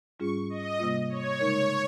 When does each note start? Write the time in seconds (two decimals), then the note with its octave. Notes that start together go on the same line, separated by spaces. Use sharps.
0.19 G#2 G3 C#4 F4 G#4 C#6
0.50 D#5
0.79 C3 G3 A#3 F4
1.09 C#5
1.39 C#3 G#3 D#4 A#4 C#5